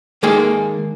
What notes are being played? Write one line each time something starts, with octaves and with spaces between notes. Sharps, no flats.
D#3 G#3 A#3 D#4 G#4 A4